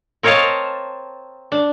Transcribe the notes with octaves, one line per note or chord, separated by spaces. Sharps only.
C4 A#4 C#5 D#5 F5 A5
D4